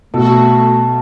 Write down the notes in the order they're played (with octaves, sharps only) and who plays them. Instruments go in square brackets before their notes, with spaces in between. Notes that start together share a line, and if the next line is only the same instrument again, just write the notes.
[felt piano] B2 [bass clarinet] A3 [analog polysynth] F#4 A4 [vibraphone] A5